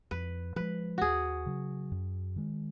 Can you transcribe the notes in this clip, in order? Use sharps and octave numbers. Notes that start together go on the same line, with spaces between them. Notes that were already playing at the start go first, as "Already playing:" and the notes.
F2 B4
F3 G#3 B4
D#2 F#4 G#4
C#3 F#3
F#2
D#3 G#3